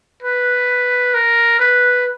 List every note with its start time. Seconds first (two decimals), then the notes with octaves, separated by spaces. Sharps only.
0.23 B4
1.14 A#4
1.59 B4